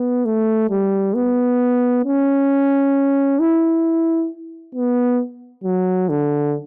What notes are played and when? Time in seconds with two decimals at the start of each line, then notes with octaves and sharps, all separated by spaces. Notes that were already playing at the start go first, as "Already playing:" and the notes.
Already playing: B3
0.25 A3
0.70 G3
1.15 B3
2.05 C#4
3.40 E4
4.75 B3
5.64 F#3
6.09 D3